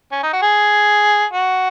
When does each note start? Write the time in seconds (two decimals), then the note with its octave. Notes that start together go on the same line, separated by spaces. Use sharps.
0.12 C#4
0.23 D#4
0.33 F#4
0.42 G#4
1.33 F#4